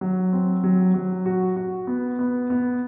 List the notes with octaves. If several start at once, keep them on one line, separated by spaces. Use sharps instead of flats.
F#3
C4
F#3
F#3
F#4
F#4
B3
B3
B3